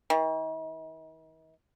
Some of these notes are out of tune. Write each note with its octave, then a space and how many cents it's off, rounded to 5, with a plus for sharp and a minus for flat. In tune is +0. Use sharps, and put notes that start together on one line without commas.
D#3 +45